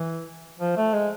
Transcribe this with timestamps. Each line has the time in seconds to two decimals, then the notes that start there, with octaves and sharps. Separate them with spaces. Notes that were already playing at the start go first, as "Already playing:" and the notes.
Already playing: E3
0.59 F3
0.77 A3
0.94 G#3